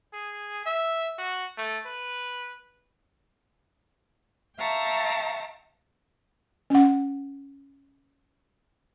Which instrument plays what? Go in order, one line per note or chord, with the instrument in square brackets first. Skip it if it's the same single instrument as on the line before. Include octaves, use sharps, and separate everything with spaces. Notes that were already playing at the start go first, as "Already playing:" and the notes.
[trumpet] G#4
E5
F#4
A3
B4
[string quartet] E5 F5 G5 A5 A#5 C#6
[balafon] C#4 F#5